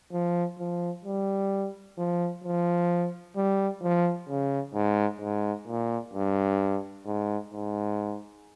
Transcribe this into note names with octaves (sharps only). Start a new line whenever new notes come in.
F3
F3
G3
F3
F3
G3
F3
C#3
G#2
G#2
A#2
G2
G#2
G#2